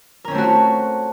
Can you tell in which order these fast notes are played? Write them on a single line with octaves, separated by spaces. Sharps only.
A#4 C#4 C4 A3 F#4